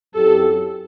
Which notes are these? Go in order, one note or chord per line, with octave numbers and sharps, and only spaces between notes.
F#2 F#3 C4 E4 G4 A4